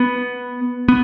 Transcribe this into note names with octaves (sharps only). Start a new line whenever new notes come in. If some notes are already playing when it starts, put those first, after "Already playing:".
Already playing: B3
B3